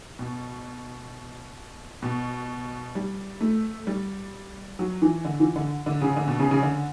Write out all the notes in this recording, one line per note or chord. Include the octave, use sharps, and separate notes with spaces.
B2
B2
G3
A3
G3
F#3
E3
D3
E3
D3
D3
C#3
D3
B2
C#3
C#3
D3